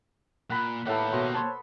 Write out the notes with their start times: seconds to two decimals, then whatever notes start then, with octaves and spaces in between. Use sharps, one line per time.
0.50 A#2 F#5 B5
0.86 A2 A#3 B3 G4 A4 F#5
1.13 B2 F#4 C6
1.34 C5 C#5 A5 B5 C6